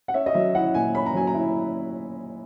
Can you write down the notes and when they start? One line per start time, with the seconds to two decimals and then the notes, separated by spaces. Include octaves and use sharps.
0.08 F#5
0.14 C#4 E5
0.26 D#5
0.34 F#3 E5
0.55 E4 F#5
0.74 A#2 G#5
0.95 C#4 B5
1.06 A#5
1.14 F#3 G#5
1.27 A#5
1.34 E4